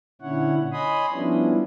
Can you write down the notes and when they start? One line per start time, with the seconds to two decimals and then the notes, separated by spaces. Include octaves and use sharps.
0.22 A#2 D3 C#4 E4 C#5 F#5
0.72 C#5 D#5 G#5 B5 C6 D#6
1.12 F3 G3 B3 C#4 D4 E4